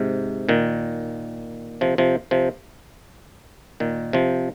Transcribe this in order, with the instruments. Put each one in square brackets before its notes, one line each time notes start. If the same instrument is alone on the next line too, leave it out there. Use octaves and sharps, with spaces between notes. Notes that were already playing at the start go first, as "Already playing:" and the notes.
Already playing: [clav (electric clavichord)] G#2 C3
A#2 D#3
C3 F3
C3 F3
C3 F3
A#2 D#3
C3 F3